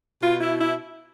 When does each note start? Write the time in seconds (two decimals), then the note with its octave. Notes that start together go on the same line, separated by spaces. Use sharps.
0.21 B2 F4
0.41 E4
0.59 E4